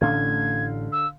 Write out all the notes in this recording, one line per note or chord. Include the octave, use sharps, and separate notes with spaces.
A1 A2 D3 C#4 F5 G#6
E6